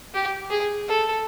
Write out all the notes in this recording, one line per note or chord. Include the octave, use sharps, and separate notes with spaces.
G4
G#4
A4